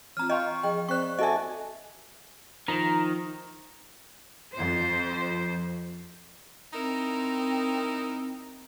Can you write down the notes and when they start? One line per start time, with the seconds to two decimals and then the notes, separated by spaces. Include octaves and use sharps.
0.17 E3 C4 F4 A#5 F6
0.30 D#5 F5 G5 C6 C#6 G6
0.63 F3 G#4 D#5 G5
0.89 C4 C5 D5 C#6 F#6
1.19 F#4 A4 D#5 E5 G#5
2.68 D#3 F3 A#5
4.54 F2 C5
6.73 C4 D#4 E4 A#4